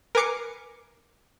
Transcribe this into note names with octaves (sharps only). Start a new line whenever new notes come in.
A#4 B4 G#5 D6 C7 C#7